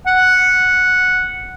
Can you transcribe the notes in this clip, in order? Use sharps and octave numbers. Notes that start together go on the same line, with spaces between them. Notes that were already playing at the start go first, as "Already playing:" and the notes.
F#5